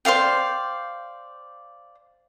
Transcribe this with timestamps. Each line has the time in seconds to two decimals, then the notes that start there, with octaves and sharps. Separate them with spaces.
0.05 C5 D5 F5 G5